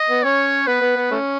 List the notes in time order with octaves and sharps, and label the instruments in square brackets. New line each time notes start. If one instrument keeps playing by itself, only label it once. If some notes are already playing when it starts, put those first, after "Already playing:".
Already playing: [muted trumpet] D#5
[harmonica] B3
[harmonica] C#4 [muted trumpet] C#5
[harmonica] B3 [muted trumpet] B4
[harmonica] B3
B3
A3 C#4